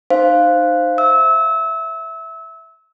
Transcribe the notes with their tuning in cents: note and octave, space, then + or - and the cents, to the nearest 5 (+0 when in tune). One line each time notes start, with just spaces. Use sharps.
D#4 -30 C5 +0 F5 +0
E5 +0 E6 -30